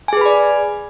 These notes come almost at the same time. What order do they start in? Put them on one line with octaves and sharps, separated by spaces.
G#5 G#4 B4 B5 D5